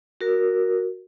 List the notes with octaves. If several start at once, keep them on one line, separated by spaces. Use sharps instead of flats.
F#4 A#4